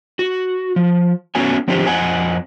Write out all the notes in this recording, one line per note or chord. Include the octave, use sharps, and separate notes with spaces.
F#4
F3
A3 B3 C#4 F#4 C#5 G#5
D#3 F3 C4 D4 G4 C5
F2 D#5 F#5 G#5